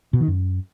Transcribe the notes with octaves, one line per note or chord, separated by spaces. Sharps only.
B2
D#3
F#2